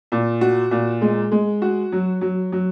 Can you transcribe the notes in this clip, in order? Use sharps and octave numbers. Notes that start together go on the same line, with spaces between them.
A#2
F#4
A#2
G#3
G#3
F#4
F#3
F#3
F#3